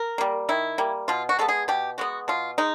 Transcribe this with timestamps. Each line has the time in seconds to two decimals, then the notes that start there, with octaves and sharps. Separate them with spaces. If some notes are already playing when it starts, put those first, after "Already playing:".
Already playing: A#4
0.18 G3 A#3
0.49 D#3 E4
0.78 G3 A#3
1.08 B2 F4
1.29 F#4
1.39 G#3 B3 A4
1.49 G#4
1.68 B2 G4
1.98 G#3 B3 F#4
2.28 B2 F4
2.58 G#3 D#4